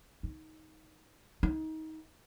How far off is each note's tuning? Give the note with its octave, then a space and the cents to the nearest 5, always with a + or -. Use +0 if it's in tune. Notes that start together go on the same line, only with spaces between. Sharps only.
D#4 +15
D#4 +25